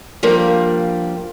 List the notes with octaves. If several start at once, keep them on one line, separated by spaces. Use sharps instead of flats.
F3 G3 A#3 D4